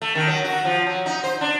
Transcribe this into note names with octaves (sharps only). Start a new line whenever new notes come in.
A3
D#3
F#3
F#4
F3
F#3
D#4
C5
D4